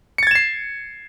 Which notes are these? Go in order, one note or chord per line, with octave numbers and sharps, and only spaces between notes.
G#6 A6 C7 C#7 E7